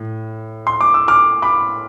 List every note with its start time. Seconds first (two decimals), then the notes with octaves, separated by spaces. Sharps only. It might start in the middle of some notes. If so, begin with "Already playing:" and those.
Already playing: A2
0.67 C6
0.81 D6
0.94 E6
1.08 D6 F6
1.42 B5 D6